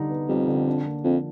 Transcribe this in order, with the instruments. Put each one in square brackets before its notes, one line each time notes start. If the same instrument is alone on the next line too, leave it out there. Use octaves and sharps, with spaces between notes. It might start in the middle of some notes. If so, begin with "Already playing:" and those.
Already playing: [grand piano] D3 G3 D#4
B3
[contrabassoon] F2 [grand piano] G3
[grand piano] D3
D4
A#3
[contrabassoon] F2 [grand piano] F3